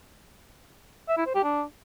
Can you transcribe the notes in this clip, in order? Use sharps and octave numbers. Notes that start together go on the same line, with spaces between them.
E5
E4
C5
G4
D4